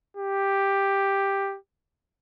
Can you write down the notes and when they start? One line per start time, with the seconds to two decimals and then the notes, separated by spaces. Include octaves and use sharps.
0.17 G4